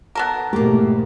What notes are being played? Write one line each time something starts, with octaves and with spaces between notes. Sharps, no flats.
B3 A4 A#4
E2 G#2 B2 A3 A#3 G4